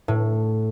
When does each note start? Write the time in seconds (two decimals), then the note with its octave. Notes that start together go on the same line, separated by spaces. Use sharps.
0.08 A2